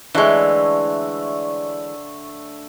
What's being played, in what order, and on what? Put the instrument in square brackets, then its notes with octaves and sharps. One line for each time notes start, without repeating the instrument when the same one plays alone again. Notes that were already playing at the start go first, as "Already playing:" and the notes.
[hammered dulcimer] D3 A3 C#5 [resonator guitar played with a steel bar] E3 G#3